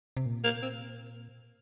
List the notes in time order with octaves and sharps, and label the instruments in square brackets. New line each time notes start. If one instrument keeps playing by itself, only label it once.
[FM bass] C3
A#2
[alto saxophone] A#3
C4